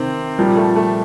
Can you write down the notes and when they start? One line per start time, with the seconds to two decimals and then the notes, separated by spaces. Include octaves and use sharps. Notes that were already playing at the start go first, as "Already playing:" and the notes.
Already playing: C3 D#3 C4
0.38 A#2 F3 G3
0.56 A3
0.76 A3